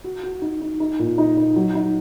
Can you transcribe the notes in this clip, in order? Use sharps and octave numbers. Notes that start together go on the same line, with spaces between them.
F#4
F#4
D#4
D#4
D#4
A#2
D#4
D#4
F#3
D#4